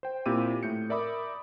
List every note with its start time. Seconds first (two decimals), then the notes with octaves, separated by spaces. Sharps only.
0.03 C5 G5
0.26 A#2 C4 E4 G4 D6 D#7
0.63 A2 G6 C#7
0.89 A#4 D5 E5 B5 D6 D#6